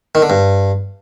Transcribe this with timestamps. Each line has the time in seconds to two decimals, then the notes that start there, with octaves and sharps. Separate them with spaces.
0.15 D#3
0.22 D3
0.30 G2